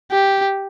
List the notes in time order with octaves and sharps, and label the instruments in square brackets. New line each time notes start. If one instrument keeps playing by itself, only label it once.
[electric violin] G4